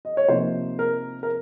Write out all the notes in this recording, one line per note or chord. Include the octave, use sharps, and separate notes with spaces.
D#5
C#5
C3 F3 A#3 D#4 C5
A#4
A#4